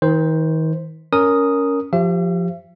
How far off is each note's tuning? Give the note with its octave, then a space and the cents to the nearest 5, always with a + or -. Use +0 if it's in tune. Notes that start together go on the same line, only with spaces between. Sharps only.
D#3 +40 C5 +0
C#4 +15 A#4 +0 D#6 +0
F3 +0 G4 +0 E5 +45